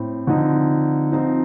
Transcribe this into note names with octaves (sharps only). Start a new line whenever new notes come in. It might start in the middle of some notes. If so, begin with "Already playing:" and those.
Already playing: A2 C4
D3 F3 C4 D#4
F3 C4 D#4